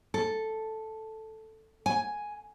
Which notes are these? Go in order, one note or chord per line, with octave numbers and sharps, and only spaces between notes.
A4
G#5